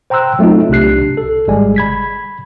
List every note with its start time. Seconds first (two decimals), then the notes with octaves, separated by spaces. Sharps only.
0.10 C5 G5 A#5 C6 E6 F#6
0.39 F#3 A3 C4 D#4 F4
0.69 C2 C3 D4 G4 F#6 C7
1.17 A4
1.48 G#1 G3 G#3 D5 G#5
1.76 B5 G#6 B6